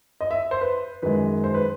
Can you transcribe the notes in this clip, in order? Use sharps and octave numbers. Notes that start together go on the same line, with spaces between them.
D#5
E5
C5
B4
F#2 D#3 G#3 B4
C5
B4